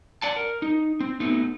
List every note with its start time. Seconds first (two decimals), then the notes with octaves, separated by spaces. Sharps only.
0.22 D5 F#5 A5
0.36 A#4
0.62 D#4
1.00 C4
1.20 A3 B3 D#4